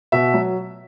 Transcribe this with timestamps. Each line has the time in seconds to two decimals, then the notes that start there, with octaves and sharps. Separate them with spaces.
0.12 B2 E5
0.34 F#3